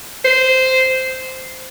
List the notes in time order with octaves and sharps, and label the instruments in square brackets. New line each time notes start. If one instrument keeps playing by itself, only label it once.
[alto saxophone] C5